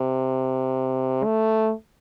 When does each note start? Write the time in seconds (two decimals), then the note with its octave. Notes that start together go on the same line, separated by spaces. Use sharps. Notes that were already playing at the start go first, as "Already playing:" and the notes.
Already playing: C3
1.24 A3